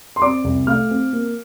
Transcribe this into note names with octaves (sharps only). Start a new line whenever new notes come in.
C6
C4 D5 D6
C2
A3 F5 F6
C4
A#3